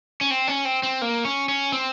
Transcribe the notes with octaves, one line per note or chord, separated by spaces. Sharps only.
C#4
C4
C#4
C4
C4
A#3
C#4
C#4
C4